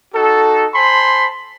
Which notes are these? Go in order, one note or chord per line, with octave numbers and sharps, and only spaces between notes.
D#4 F#4 A4
C5 G#5 A5 B5 C6